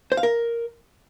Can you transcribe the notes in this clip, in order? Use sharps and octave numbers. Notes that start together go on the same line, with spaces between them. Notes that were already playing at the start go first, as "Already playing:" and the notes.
C5
F5
A#4